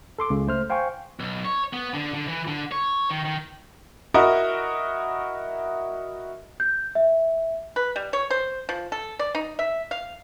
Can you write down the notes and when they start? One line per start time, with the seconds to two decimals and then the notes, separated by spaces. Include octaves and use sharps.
0.19 A4 C6 D6
0.30 C#2 C#3 G#3
0.47 A3 C5 F6
0.70 C5 F5 G5 G#5 C#6
1.20 B1
1.45 C#5
1.73 B3
1.94 D3
2.14 D3
2.28 E3
2.47 D3
2.72 C#5
3.11 D#3
3.25 D#3
4.14 E4 F#4 A#4 D#5
6.60 G6
6.95 E5
7.76 B4
7.96 G3
8.13 C#5
8.31 C5
8.69 F3
8.92 A4
9.19 D5
9.35 D#4
9.59 E5
9.91 F5